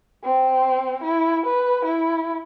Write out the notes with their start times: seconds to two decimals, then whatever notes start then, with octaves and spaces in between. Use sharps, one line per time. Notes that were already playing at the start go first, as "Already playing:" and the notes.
0.24 C4
1.03 E4
1.46 B4
1.85 E4